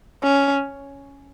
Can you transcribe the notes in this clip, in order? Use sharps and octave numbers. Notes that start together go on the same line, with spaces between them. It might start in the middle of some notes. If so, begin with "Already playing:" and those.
C#4